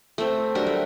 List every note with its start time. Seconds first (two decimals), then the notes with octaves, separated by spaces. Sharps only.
0.18 A3 C4
0.55 F#3 G3 D4 A#4
0.66 A3